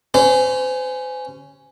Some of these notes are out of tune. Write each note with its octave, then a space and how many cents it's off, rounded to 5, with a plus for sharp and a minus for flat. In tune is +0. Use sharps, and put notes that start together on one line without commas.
C#4 +0 C5 -40